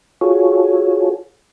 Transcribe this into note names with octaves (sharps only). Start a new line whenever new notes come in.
F4 F#4 G#4 A4 C#5